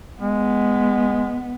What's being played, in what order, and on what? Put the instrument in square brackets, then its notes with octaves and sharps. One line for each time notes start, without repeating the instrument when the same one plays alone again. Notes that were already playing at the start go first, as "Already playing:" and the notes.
[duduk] G#3 [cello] B3